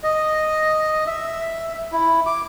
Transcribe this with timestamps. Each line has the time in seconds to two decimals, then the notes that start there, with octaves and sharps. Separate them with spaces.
0.04 D#5
1.07 E5
1.92 E4
2.26 D6